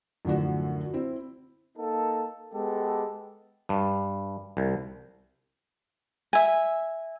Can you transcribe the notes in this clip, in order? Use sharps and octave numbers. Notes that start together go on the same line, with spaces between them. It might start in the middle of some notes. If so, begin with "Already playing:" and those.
F#2 A2 D3 F3 F#4
C4 E4
A#3 D#4 A4
G#3 B3 G4 A4
G2
C2
E5 G#5